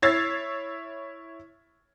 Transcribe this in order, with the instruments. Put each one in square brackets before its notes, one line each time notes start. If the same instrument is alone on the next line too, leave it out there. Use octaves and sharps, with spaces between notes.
[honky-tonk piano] E4 C#5 E6 G#6 A6 C7